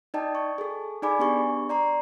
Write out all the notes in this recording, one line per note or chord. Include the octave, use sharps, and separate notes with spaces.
D#4 D5 D#5 G5 A5
C#6
G#4 A4
D#4 G#4 D5 G#5 B5 D6
B3 D4 G4 C#6
D5 A#5 C6